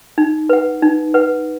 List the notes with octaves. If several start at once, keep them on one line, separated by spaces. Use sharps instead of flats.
D#4
B4 F#5
D#4
B4 F#5